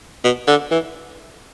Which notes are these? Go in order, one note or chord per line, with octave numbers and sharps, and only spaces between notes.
B2
D3
E3